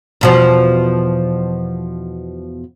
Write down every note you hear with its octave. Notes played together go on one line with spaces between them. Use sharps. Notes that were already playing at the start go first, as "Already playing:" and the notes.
E2 B2 F3